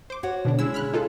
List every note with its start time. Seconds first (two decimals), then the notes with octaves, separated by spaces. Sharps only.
0.10 C5 D6
0.23 F#4 C#5 F#5
0.45 B2 D3 D4
0.59 C#3 G#3 E4 E6
0.74 B5 F6 F#6
0.93 D#4 F4 A4